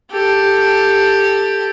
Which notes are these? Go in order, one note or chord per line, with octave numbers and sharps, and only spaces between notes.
G4 A4